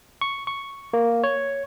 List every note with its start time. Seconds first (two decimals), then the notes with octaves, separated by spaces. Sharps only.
0.21 C#6
0.47 C#6
0.93 A#3
1.24 C#5